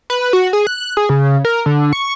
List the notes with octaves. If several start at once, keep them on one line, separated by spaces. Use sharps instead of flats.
B4
F#4
G#4
F#6
G#4
C#3
A#4
D3
C#6